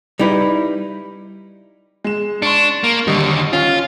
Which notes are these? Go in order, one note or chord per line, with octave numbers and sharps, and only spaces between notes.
G3 D#4 E4 B4
G#3 E7
D4 C6 C#6 C#7
A#3
D#2 D3 G3 D#5 C#6
C#4 F4 F6